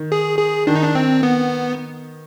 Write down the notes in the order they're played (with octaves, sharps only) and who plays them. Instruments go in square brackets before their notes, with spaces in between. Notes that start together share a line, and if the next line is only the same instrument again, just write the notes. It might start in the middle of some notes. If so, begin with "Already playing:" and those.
Already playing: [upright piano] D#3
[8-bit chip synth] G#4
G#4
[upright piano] D#3 [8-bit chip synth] D4
[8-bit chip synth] D#4
D4
C4
B3